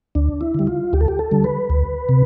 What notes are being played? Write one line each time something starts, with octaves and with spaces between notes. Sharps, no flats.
D2 D4
E4
D3 G3
F4
D2 G4
A4
G4
A4
D3 G3
B4
D2
C3